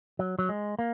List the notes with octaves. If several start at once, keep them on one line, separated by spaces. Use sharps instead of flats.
F#3
F#3
G#3
A#3